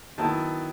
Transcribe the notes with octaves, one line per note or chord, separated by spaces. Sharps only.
D#3 F#3 B3 E4 A5